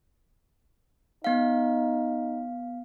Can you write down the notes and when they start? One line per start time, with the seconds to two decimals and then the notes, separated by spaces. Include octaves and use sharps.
1.24 B3 D#4 F5